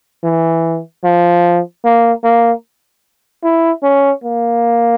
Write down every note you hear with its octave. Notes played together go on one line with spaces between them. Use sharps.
E3
F3
A#3
A#3
E4
C#4
A#3